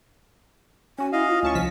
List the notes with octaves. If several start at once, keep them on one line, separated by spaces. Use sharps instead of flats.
C#4 F#4 G#5
E4 D#5 F5
F4
D2 C#4 A5 C#6
C2 F3 B6